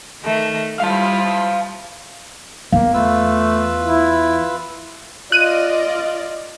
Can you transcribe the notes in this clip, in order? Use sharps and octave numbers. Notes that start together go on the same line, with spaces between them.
D#3 A3
G3 E4 F4 F5 A5
E2 A#3 F5
A3 F4 B4 E6
E4
F4 D5 D#5 F#6 D#7